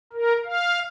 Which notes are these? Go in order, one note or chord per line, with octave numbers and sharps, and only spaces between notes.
A#4
F5